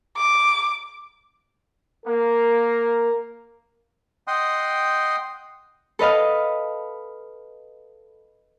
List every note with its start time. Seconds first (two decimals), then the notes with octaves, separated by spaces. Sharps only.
0.17 D6
2.06 A#3 A#4
4.27 D#5 F#5 G5 C6 D#6
5.99 A4 B4 D#5 F5